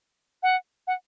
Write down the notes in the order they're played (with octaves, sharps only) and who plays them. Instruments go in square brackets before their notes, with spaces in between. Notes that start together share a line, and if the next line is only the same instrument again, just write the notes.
[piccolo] F#5
F#5